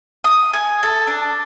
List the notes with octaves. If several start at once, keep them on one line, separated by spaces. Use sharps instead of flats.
D#6
G#5
A4
D4